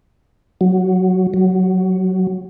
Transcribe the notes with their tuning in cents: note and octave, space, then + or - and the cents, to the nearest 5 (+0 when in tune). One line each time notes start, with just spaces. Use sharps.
F#3 +0
F#3 +5